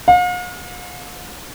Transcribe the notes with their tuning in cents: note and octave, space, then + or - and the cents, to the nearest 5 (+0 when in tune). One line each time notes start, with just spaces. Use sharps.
F5 +45